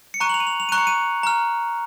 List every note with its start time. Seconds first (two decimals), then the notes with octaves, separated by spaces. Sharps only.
0.14 C#7
0.20 A#5 C#6 F#6 D#7
0.29 F#7
0.34 F7
0.40 D#7
0.47 F7
0.60 F7
0.69 A#5 C#6 F#6 D#7
0.78 C#7
0.87 D#7
1.23 A#5 F6